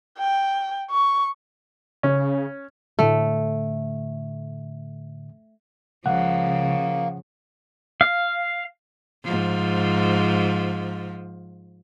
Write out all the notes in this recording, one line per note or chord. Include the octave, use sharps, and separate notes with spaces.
G5
C#6
C#3 C#4
A2 D3 A3
C#2 C#3 F3 A#3 F#5
F5
G#2 F3